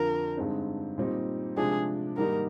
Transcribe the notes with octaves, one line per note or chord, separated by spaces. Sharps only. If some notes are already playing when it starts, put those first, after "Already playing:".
Already playing: F2 D3 F3 A#4
G2 D3 G#3 C4 D#4
A#2 G3 C4 D#4
C3 F3 G#3 D4 G#4
G#2 D#3 G3 A#3 D#4 A#4